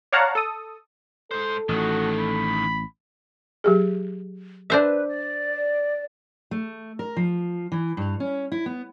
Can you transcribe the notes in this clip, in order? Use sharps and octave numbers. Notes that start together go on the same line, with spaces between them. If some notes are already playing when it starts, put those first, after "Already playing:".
C#5 D5 F5 F#5 A5 A#5
A4 D#6
G#2 A4 C5
A1 A2 D#3 F#4
B5
F#3 G4 G#4
D4 B4 C5 E5
D5
A3
A#4
F3
E3
G2
C#4
E4
B3